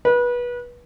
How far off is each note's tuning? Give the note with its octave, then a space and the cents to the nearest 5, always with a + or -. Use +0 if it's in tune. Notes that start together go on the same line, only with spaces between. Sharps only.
B4 -25